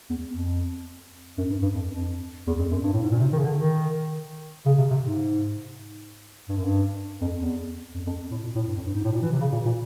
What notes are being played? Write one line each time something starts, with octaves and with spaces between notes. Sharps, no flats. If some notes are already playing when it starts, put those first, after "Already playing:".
E2
F2
F#2
G2
G2
F2
F2
E2
F2
F#2
G2
A2
G#2
A#2
C3
D#3
C#3
D3
D#3
C#3
C3
C3
G#2
G2
F#2
G2
F2
E2
F2
F2
A2
A#2
A2
G2
F2
G2
G#2
A2
A#2
E3
C3
C#3
A#2
A#2